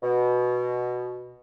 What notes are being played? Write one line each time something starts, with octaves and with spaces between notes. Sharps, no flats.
B2